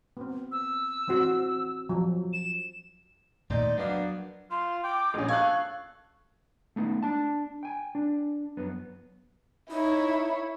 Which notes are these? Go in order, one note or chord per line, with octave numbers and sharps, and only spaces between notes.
B3 C4
E6
E3 C4 F#4
F3 F#3
E7
D#2 A#2 A3 D#4 C5 D5
F#3 A#3 B3 D4
F4 C6
G5 D6
A#1 C#4 D#5
A4 F5 C#6 F#6 G#6
A3 B3 D#4
D4 A5
G5 G#5
D4
F#2 B3
D#4 E4 C#5